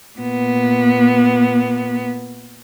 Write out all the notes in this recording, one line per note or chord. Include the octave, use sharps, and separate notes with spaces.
A#2 B3